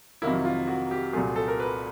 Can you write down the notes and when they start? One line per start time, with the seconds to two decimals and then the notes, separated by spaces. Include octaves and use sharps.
0.22 F2 C3 D#3 F#3 A#3 E4
0.45 F4
0.68 F#4
0.91 G4
1.13 C2 A#2 F#3 A3 G#4
1.36 A4
1.48 A#4
1.59 B4